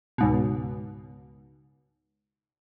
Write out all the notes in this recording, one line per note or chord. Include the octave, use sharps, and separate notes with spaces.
C#2 G#2 B2